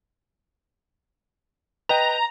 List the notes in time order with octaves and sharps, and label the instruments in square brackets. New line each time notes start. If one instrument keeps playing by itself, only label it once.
[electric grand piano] B4 D#5 G5 [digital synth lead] A#5